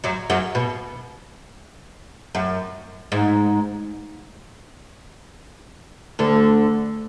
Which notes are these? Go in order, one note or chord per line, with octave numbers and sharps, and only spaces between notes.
F#2 F#3
F#2 F#3
B2
F#2
G#2
D2 D3